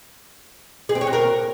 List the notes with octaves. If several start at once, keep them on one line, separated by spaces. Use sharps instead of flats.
G#4
C4
C#5
F#4
A#4